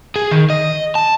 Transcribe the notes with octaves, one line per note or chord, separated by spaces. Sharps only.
G#4
D#3
D#5
A5